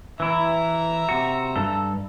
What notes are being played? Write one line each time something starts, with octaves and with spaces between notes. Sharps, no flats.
E3 E4 E5 A#5
C3 F#4
G2 A4